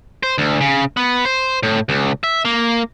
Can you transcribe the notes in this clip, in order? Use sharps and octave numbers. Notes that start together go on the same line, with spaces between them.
C5
D2
C#3
B3
C5
A2
C#2
E5
A#3